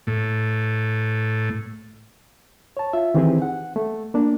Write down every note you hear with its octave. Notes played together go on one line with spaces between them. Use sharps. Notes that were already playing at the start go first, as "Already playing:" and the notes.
A2
C#5 A5
F4 E5
D#3 E3 C4 D#4 G4 G#4
F#5
A3
A#3 D4